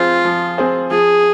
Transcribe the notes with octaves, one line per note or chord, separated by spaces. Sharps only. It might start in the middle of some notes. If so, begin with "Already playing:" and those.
Already playing: F3 C4 F4 G#4 C5
F3
C4 G#4 C5
F3 G#4